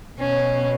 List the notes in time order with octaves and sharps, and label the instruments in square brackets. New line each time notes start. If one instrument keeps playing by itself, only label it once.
[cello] B2 [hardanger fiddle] C#4